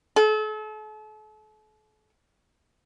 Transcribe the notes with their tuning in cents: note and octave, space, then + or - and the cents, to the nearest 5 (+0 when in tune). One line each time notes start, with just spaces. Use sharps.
A4 -40